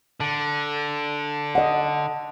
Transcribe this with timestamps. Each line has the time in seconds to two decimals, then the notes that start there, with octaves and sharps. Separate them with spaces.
0.20 D3
1.55 D#5 F#5